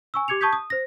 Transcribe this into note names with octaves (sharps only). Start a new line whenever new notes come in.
G#5 C#6 E6
G4 D6 G#6 C#7 F7
A5 C#6 D#6 G6 G#6 B6
D#6
C5 A#6